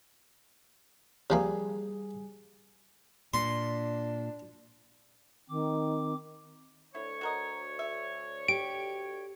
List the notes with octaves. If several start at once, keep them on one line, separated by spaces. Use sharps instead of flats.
C3 F3 G3 A#3 G#4
A#2 D4 C6
D#3 C4 D6
D2 E4 C#5
F#4 A#4 D#5
E5
G4 D7